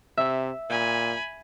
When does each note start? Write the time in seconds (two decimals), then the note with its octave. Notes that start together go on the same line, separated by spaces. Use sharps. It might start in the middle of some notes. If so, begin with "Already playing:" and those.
0.17 C3 E5
0.70 A#2 G#5 B5